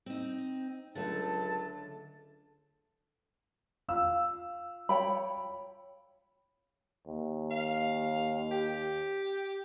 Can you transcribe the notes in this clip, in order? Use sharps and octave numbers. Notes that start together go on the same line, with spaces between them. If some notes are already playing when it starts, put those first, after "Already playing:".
C4 D#4
C#2 D3 F#3 A3 A5
F4 F5 E6
C#5 G5 B5
D#2
F5
G4